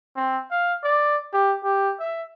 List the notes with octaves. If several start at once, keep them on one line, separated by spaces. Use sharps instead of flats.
C4
F5
D5
G4
G4
E5